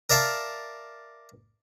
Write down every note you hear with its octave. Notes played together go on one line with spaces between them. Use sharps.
A#4 D5 E5 F5 A5